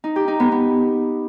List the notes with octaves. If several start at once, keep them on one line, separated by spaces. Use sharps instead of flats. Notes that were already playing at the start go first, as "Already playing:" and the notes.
D#4
G4
D#4
B3
B3